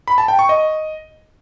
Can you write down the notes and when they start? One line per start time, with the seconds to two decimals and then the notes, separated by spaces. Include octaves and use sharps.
0.08 B5
0.18 A5
0.28 G5
0.39 C#6
0.49 D#5